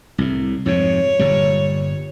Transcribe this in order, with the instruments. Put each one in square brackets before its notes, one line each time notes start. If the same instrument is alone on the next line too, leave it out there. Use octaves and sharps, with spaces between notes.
[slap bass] C2 A2
[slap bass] F2 G#2 C3 [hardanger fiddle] C#5
[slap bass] G1 A#2 G3